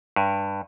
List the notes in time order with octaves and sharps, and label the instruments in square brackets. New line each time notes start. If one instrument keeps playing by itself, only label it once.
[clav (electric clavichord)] G2